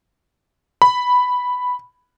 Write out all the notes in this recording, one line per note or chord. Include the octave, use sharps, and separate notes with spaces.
B5